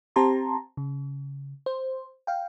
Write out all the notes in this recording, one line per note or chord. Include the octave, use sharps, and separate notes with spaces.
C4 G4 A5 A#5 C6
C#3
C5
F5 G5